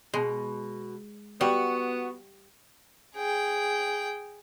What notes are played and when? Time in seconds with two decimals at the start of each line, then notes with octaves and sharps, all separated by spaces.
0.14 B2 G#3
1.41 G3 B3 F#4
3.16 G#4 G5